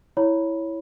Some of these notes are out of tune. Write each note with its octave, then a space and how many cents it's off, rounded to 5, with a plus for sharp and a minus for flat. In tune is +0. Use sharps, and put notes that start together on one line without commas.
E4 +0 C#5 +0 B5 -15